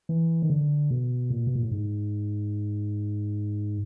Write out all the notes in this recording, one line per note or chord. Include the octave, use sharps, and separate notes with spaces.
E3
D#3
D3
B2
A#2
B2
A#2
A2
G#2